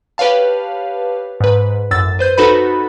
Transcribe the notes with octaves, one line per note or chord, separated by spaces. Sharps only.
G4 B4 C#5 F5 A5
G#2 B4
A1 F#2 E6 A6
B4 C5 G6 D#7
D#4 F#4 A4 B4 B5